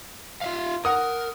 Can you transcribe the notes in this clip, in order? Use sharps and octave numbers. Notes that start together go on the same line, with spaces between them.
F4 E5 F5
A#4 F#5 D#6